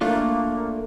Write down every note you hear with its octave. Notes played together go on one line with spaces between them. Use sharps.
A3 A#3 D4 F4